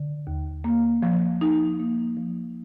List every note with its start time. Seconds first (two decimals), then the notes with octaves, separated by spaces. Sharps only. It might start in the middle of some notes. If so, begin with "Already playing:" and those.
Already playing: D3
0.27 D#2
0.64 A#3
1.02 F3
1.41 D#4
1.80 A#3
2.17 F3